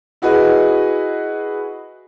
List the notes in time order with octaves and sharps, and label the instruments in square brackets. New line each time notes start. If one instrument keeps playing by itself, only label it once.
[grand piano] E4 F#4 G#4 B4 D#5